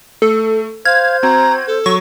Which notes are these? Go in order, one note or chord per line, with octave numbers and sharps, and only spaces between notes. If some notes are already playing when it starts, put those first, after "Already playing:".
A3 A4
C5 F5 F6 G#6
C4 F#4 A#5
A4
F#3 C#6